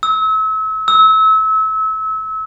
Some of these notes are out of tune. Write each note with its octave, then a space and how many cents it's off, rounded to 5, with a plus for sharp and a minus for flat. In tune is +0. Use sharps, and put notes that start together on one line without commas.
E6 -35
E6 -30